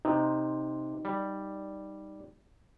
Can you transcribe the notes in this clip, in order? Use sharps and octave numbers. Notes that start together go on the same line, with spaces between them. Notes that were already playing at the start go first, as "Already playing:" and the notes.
C3 D#4
G3